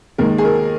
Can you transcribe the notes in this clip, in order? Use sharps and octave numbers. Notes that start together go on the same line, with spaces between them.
D#2 D#3 G#3 A#4
G#4
A#4